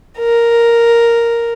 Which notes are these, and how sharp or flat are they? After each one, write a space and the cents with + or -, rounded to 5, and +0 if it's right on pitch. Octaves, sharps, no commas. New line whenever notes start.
A#4 +0